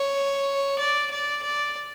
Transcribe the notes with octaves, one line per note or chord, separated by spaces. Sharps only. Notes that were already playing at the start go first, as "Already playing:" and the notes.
Already playing: C#5
D5
D5
D5